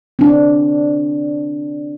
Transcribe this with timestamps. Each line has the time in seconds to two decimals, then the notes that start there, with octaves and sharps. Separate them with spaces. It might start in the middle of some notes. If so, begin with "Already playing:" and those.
0.19 C4 D4